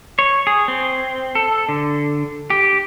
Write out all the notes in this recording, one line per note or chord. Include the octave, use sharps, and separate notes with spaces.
C#5
G#4
C4
A4
D3
G4